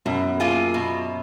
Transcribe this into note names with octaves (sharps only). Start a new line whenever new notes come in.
F#2 B2
A#3 F4 G#4
B2